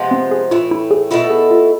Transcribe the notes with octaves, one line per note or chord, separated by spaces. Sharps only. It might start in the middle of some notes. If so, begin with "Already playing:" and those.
Already playing: C3 F3 G#3 B3
C4
G#4
A2 E3 A3 F4
E4
G#4
B2 A3 E4 F4 A4
G#4
F4